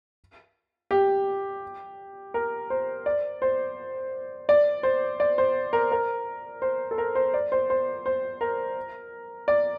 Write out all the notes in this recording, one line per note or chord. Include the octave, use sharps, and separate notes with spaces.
G4
A#4
C5
D5
C5
D5
C5
D5
C5
A#4
A#4
C5
A4
A#4
C5
D5
C5
C5
C5
A#4
D5